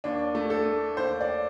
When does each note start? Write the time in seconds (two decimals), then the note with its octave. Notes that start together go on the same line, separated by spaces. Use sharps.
0.04 D#2 D4
0.35 A3
0.50 A4
0.66 A3
0.97 D#2 C5
1.21 D5